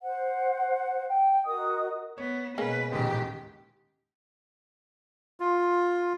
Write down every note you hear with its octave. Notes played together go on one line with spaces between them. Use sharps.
C5 F#5
G5
F#4 A#4 D#5 D#6
B3 C#5
B2 G#3 A#3 C#4 B4
D#1 A1 G#2 G4
F4